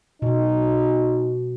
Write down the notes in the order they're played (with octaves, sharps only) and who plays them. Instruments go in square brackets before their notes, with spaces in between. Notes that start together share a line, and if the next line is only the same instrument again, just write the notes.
[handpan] B2 [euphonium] D#4